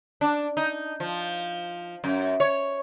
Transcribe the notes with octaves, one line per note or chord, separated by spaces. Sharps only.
D4
D#4
F3
F#2
C#5